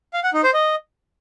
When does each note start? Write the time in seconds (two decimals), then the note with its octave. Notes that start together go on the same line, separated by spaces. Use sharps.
0.13 F5
0.24 F#5
0.34 D#4
0.44 C5
0.54 D#5